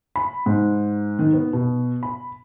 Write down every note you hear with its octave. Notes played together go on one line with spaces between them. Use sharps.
B5
G#2
D#3
B3
B2
B5